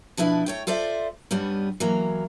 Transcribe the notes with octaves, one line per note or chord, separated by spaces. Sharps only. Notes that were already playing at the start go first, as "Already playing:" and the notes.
B2 F3 D4 E4 B4
A3 C#5 G5
F4 A4 C5 D5 E5
G2 G3 B3 C#4
E3 F#3 A#3